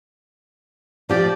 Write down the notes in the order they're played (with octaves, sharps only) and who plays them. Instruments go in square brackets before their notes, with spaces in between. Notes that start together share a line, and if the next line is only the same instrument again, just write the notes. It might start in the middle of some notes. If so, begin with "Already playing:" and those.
[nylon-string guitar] F3 G4 [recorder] D5